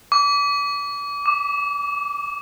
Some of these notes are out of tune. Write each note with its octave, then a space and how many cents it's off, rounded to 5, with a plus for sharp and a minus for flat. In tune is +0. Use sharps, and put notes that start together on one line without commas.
D6 -35
D6 +0